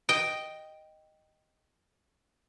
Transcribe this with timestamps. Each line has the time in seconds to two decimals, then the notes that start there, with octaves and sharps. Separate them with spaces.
0.09 D#5 G5